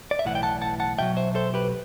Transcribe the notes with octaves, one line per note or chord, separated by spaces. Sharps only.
D5
E5
B1 A2 E3 F#5
G5
F#5 A5
F#5 A5
F#5 A5
B1 B2 F#3 E5 G5
C5 E5
A4 C5
G4 B4